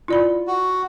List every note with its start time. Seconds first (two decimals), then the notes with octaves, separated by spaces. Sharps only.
0.08 E4 F4 D5 B5
0.47 F#4